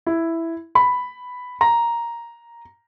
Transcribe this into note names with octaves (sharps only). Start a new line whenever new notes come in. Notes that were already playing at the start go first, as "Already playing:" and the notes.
E4
B5
A#5